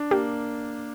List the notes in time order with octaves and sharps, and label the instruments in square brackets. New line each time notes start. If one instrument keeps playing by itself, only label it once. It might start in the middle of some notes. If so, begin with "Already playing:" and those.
Already playing: [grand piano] D4
[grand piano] A#3 [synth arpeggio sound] G4